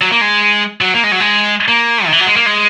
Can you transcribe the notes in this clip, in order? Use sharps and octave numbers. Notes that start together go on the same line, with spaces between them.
F#3
A#3
G#3
F#3
A#3
G#3
F#3
G#3
A#3
D#3
E3
F#3
G#3
A#3
G#3